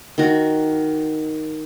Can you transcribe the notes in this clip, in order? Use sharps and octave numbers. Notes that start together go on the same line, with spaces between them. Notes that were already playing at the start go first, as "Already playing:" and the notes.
D#3 F#4